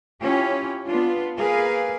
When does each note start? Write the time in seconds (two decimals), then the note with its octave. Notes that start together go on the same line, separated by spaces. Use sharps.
0.21 C#4 E4 F4 G4
0.85 B3 D4 F4
1.37 A#3 G#4 A#4 B4 F5